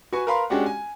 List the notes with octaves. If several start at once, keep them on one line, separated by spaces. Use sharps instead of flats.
F#4 B4 G#5 C#6
A#4 B4 F5 B5 C6
G#3 C#4 D4 F#4 G4 F#5
G#5